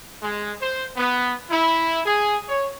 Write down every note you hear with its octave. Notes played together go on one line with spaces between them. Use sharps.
G#3
C5
B3
E4
G#4
C#5